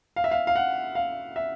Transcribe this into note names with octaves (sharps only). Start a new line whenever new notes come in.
F5
E5
F5
F5
F#5
F5
E5